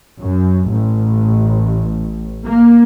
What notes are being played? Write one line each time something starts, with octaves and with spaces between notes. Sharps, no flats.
F#2
A1
A#3